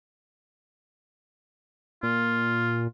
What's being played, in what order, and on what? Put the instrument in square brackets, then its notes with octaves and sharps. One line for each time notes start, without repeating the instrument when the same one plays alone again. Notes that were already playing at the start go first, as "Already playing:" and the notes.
[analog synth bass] A#2 [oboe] F4